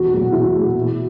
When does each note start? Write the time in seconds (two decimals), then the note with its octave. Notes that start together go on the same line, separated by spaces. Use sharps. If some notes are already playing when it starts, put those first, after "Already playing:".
Already playing: E2 F#4
0.12 B2 F#3 A3
0.32 E2 E4
0.54 B2 F#3 A3
0.75 B2